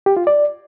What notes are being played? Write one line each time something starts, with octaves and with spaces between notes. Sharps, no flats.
G4
F4
D5